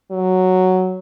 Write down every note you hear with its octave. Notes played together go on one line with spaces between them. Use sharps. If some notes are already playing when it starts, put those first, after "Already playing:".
F#3